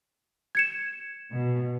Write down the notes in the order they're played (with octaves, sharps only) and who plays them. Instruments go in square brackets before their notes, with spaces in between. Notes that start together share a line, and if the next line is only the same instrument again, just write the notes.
[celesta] G#6 C#7 E7
[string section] B2